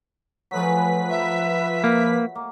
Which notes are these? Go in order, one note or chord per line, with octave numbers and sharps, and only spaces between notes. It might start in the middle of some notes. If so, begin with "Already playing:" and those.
F3 F#3 A3 G#4 B4 B6
E5
A#3
A#3